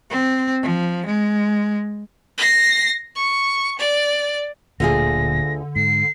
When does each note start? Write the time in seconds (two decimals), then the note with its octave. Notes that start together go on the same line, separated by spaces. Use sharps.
0.10 C4
0.62 F3
1.06 G#3
2.38 A#6 C7
3.15 C#6
3.79 D5
4.80 D1 D2 A#2 D3 F4 G#4 A#6
5.76 G#2 C7